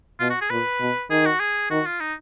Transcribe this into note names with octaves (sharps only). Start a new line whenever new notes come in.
B2 F4
F#4
G#4
A#2 B4
B2
D#3 G#4
F#4
G#4
D#3 F#4
F4
D#4